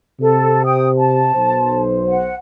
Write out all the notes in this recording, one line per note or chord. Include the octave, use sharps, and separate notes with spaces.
C3 A4
G5 D#6
A5
B1 C5
F#5